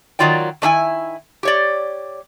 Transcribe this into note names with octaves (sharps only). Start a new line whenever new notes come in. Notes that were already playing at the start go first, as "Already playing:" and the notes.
D#3 F3 F#3 F4 D5 G5
D#3 D4 E4 G#5
G4 C#5 D5